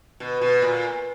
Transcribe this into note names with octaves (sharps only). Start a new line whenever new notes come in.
B2
B2
A#2